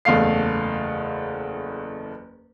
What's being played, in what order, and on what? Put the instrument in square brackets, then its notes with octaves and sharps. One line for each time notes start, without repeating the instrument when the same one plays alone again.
[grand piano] F#1 E2 A3 F5 C7